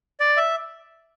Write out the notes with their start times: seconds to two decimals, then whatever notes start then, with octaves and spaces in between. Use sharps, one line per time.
0.20 D5
0.37 E5